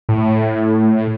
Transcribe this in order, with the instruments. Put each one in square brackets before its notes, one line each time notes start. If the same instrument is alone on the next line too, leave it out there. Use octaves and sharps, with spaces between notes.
[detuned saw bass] A2